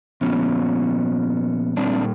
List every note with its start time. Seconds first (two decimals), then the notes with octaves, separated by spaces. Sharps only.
0.21 A#2 F3 B3 C#4
1.77 A#2 G3 C4 D4